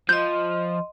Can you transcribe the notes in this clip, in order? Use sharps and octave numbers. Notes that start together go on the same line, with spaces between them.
F3 D#5 C6 G6